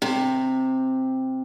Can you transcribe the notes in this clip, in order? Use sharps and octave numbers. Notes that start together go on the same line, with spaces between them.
C3